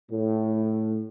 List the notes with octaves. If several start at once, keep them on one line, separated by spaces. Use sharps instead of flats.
A2